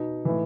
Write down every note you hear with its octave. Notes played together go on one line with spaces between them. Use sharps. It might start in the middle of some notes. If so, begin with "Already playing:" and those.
Already playing: B2 D#4
A2 E3